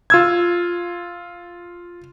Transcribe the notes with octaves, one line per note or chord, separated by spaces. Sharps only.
F4 E6 G#6